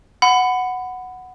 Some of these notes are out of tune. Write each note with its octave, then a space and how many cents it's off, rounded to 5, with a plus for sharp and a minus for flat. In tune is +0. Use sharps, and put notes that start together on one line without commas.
F#5 +0 B5 +20